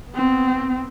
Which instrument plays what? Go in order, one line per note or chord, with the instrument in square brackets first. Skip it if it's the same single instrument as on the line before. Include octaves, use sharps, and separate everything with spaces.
[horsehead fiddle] B3 C4